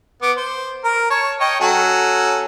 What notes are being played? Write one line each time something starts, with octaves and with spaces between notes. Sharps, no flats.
B3 D6
C5
A#4
C#5 A5
C#5 D#5 G5
F#3 C#4 A4